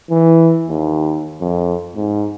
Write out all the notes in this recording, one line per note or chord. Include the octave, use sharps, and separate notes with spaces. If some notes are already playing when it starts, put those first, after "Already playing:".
E3
D#2
F2
G#2